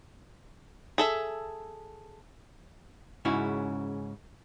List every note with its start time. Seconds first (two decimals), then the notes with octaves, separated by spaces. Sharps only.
0.98 G#4 A4 E5
3.25 G#2 C#3 C#4 E4 F#4